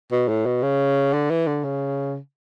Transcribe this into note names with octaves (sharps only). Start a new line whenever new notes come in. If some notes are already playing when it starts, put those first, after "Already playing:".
B2
A2
B2
C#3
D3
E3
D3
C#3